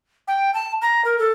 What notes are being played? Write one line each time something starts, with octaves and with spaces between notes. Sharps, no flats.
G5
A5
A#5
A#4
A4